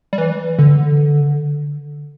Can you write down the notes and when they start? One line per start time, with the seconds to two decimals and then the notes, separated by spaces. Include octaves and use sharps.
0.13 G3
0.18 E3
0.59 D3